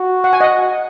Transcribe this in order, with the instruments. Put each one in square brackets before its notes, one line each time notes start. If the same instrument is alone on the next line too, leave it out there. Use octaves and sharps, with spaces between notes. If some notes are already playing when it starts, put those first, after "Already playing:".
Already playing: [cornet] F#4
[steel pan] F#5
G#5
D#5 F#5